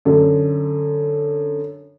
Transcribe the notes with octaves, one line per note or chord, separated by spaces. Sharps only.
F#2 D3